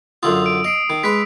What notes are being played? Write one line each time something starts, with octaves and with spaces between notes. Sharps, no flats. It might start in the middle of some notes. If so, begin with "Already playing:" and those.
F#2 D3 F4 D#6 E6
D7
D#5 D#6 C7 D7
D#3
G#3 B4 B6